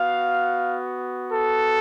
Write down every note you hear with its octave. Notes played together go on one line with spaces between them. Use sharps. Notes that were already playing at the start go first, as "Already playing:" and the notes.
Already playing: B3 F#4 F5
A4